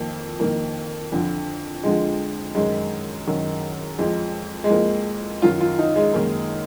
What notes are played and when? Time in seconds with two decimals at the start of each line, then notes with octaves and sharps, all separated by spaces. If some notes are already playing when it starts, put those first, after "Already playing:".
Already playing: F2 D#3 A#3
0.40 F2 D#3 A#3
1.12 F2 D3 F3
1.83 F2 D3 F3 G#3
2.55 F#2 D#3 G#3
3.27 F#2 D#3
3.99 F2 F3 G#3
4.64 G#3
4.70 F2 F3 A#3
5.42 F#2 D#3 F4
5.61 F4
5.79 D#4
5.96 G#3
6.14 F#2 D#3 A#3